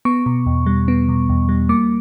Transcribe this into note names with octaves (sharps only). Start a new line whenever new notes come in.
B3 C#6
B2
E2
G3
B3
B2
E2
G3
A#3 D6